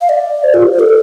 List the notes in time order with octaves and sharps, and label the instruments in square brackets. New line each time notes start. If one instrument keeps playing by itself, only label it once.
[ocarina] F5
D5
C5
F4
G4
C5
A4